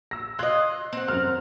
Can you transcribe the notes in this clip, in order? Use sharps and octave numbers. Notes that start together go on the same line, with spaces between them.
E6 A#6
F4 D#5 C6 F#6 G#6
C4 F#5
F#2 A#4 F6